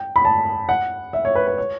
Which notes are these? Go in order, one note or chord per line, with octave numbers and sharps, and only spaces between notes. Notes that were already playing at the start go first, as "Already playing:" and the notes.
Already playing: G5
B5
A5
F#5
E5
C#5
B4
B4
C#5